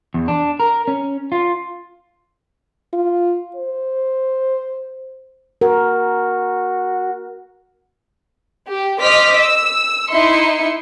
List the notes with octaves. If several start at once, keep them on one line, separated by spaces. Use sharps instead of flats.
E2
D4
A#4
C#4
F4
F4
C5
F#4 A#4
G4
C5 D#5 D6 F6 B6
E6
D#4 E4 E5 C6 C#7